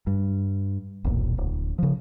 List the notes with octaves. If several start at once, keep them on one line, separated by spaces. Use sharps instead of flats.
G2
E1 B1 A#2
D1
C#3 F3